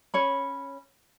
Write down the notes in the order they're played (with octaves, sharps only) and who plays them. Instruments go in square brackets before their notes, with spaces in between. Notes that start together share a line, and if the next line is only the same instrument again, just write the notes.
[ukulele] C#4 C#5 B5